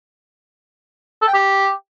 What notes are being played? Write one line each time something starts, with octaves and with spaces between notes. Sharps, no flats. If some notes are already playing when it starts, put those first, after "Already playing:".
A4
G5
G4